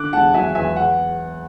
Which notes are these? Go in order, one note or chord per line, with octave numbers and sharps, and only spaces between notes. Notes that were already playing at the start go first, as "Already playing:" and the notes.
Already playing: D3 D6 F#6
E1 F#5 A5
F#3 E5 G#5
E2 E5 G#5
F#5